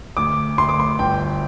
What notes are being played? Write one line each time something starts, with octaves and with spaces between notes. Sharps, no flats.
D2 D6
D2 C6
D6
C6
G1 G5